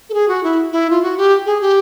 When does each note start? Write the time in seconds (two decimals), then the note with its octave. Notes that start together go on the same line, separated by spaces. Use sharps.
0.10 A4
0.14 G#4
0.28 F#4
0.43 E4
0.72 E4
0.90 F4
1.02 F#4
1.17 G4
1.46 G#4
1.61 G4